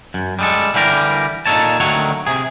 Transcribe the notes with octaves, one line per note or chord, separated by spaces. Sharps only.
F#2
G3 G#3 A4
D3 E3 G3 G4 A4 A#4
A#2 D#4 A4 C#5 A5
D2 D#3 F#3 A3 C#5
C3 G#4